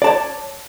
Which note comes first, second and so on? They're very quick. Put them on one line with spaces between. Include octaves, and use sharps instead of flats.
D5 A5 C#5